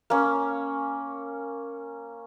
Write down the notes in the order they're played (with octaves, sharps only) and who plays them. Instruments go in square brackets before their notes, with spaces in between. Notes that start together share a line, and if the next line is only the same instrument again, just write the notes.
[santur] A#3 C#4